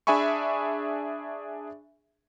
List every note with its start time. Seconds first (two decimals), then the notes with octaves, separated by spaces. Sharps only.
0.07 D4 G#4 E5 G#5 B5 C#6